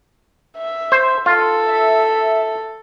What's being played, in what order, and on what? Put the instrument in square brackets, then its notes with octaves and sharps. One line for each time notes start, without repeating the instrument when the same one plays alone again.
[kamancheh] E5
[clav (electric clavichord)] C5
[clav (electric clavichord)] F4 [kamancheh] A4
[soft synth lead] E5